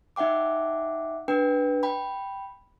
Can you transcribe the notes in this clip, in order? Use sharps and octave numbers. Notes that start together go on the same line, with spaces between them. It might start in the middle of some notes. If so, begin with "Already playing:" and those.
D#4 E5 F#5 G5 D6
D4 B4 G5
G5 B5